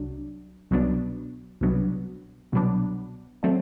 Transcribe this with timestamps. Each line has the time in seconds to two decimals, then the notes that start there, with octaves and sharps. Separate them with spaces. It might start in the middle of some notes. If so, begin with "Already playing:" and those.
Already playing: C2 F#3 D4
0.71 C2 B2 F#3 B3 D4
1.61 C2 B2 F#3 B3 D4
2.52 C2 B2 F#3 B3 D4
3.43 D3 F#3 A3 C4